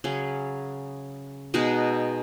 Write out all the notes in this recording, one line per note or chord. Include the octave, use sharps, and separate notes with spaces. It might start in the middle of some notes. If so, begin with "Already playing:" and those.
C#3 F#3 C#4 G#4
B2 G#3 D#4 G#4